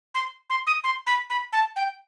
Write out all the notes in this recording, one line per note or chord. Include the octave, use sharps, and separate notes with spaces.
C6
C6
D#6
C6
B5
B5
A5
G5